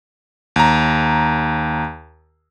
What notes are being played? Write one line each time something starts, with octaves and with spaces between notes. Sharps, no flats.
D#2 A#5